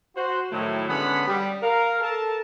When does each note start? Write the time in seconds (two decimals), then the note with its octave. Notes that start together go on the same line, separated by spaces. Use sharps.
0.16 F#4 C5
0.52 A2 D#3 F#3 A3 E4
0.88 D3 G#3 B3 C#4 F#5 B5
1.28 G3
1.62 A#4 F5
2.01 A4 A#4 A5